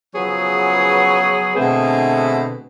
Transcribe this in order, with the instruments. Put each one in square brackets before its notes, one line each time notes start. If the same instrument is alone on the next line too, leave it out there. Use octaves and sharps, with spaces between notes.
[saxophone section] C#3 F3 F#3 B3 G#4 C#5
B2 D3 A3 B3 C4 G#4